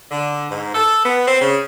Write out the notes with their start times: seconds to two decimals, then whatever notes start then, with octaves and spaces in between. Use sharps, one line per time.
0.11 D3
0.51 G#2
0.75 A4
1.05 B3
1.27 C4
1.42 C#3